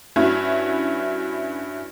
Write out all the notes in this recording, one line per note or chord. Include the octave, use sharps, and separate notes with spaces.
G2 C#4 E4 F#4